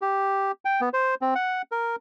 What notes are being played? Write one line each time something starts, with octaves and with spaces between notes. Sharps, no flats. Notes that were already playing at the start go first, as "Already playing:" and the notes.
G4
G5
B3
C5
C4
F#5
A#4